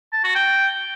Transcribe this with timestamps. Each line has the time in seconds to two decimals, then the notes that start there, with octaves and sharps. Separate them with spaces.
0.13 A5
0.24 F#4
0.35 G5